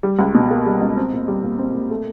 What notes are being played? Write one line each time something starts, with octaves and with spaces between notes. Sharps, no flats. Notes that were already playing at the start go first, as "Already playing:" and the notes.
G3
C#2
B2
A#3
G3
C#2
C4
A#2
G3
A#2
C4
A#2
A3